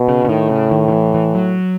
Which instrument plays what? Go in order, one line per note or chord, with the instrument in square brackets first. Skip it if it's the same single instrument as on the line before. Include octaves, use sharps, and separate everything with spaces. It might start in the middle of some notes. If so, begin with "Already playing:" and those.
Already playing: [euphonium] B2
[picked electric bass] C#3
C#3
[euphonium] A2 [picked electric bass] D#3
[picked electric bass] C#3
D#3
D#3
E3
E3
F#3